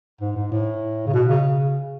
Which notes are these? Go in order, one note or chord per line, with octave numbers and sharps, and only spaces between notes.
G#2
G#2
A2
C#3
B2
C#3